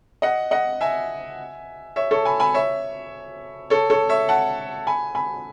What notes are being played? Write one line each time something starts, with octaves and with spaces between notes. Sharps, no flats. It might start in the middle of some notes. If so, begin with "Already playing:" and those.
D#5 F#5
D#5 F#5
E5 G#5
C#5 E5
A4 C#5
G#5 B5
G#5 B5
C#5 E5
A4 C#5
A4 C#5
C#5 E5
F#5 A5
G#5 B5
G#5 B5